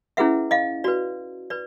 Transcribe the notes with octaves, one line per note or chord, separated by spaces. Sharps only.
C#4 E4 G#4 B4 E5 F#5
D#5 F5
F#4 B4 D5
B4 D5